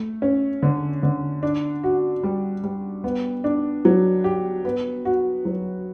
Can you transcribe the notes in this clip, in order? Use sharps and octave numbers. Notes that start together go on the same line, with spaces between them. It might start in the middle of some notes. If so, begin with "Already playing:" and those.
Already playing: A3
C#4
D3
D3
D4
F#4
G3
G3
B3
D4
F#3
G4
B3
F#4
F#3